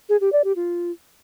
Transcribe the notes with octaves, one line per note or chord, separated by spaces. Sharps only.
G#4
G4
D5
G4
F4